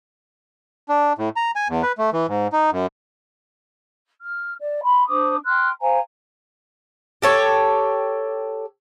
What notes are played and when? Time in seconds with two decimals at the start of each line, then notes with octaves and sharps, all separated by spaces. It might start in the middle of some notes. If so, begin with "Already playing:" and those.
0.89 D4
1.18 A2
1.36 A#5
1.56 G#5
1.69 E2
1.83 B4
1.98 A3
2.13 E3
2.28 G#2
2.53 D#4
2.72 F#2
4.21 F6
4.60 D5
4.82 B5 C6
5.08 D4 C5 D6 D#6
5.45 G5 C6 F6 F#6
5.81 C5 F5 G#5 A#5
7.22 G4 A4 C#5